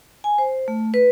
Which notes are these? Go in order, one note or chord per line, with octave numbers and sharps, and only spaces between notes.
G#5
C5
A3
B4